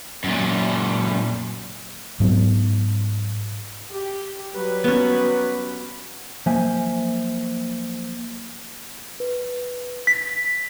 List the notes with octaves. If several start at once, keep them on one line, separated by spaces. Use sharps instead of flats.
F#2 A#2
G#2 F#3 B3 C4
G4
F#3 G3 B4
B3 C#4
F3 F#3 A#3 C5 E5 G#5
B4
B6